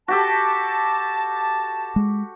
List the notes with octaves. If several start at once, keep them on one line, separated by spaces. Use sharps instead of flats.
F#4 G4 A4 A5
G#3